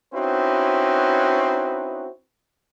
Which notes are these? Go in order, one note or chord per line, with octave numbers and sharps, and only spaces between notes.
C4 C#4 D#4 E4 F#4 B4